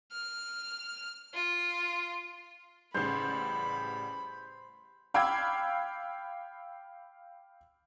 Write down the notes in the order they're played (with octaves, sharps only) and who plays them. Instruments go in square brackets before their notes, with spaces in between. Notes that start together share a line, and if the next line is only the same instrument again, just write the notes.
[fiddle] F6
F4
[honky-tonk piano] A1 C#3 G3 [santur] C5 [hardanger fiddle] B5
[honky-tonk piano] F5 G5 B5 D6 E6 G#6